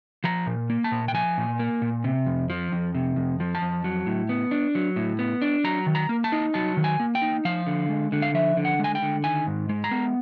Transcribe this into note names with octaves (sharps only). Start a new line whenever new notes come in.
F3 A#5
A#2
A#3
A5
A#2
G5
F3 G#5
A#2
A#3
A#2
C3
F2
F3
F2
C3
F2
F3
A5
F2
F#3
A2
B3
D4
F#3
A2
B3
D4
F#3 A#5
D#3
A#5
A#3
A5
D#4
F#3 A5
D#3
G#5
A#3
G5
D#4
F3 F5
D3
G#3
D3
F5
F3 E5
D3
F#5
G#3
G#5
G5
D3
D#3 G#5
G#2
G#3
A#5
B3